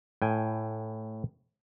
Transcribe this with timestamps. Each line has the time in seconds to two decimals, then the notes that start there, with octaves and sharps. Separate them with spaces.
0.22 A2 G5 G#5